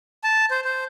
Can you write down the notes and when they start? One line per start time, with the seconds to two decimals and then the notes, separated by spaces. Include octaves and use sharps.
0.24 A5
0.50 C5
0.65 C5